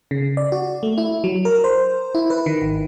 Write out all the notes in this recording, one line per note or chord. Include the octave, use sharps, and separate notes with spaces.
C#3
D5
F#4
A3
E4
F#3
A#4
C5
E4
B4
D#3
G#1